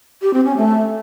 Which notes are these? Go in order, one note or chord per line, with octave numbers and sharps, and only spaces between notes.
G4
C4
C#4
A3